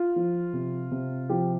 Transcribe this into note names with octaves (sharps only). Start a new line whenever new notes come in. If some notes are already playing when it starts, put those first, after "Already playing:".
Already playing: F4
F3
C3
C3
F3 G4